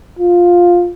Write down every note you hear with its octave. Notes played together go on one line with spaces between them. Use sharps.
F4